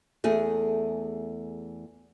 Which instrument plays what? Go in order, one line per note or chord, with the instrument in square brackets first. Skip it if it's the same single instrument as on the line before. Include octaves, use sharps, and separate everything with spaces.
[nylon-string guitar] E2 A3 G#4